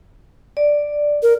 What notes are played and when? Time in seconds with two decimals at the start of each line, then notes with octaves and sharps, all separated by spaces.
0.57 D5
1.23 A#4